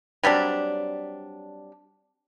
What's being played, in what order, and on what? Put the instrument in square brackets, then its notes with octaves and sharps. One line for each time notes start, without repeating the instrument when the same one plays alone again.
[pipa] F#3 G3 C4 D4